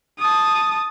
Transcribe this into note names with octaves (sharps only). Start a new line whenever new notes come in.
A5 D#6